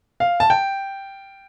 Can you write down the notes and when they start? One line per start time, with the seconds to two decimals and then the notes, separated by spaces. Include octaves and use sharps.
0.20 F5
0.40 A5
0.50 G5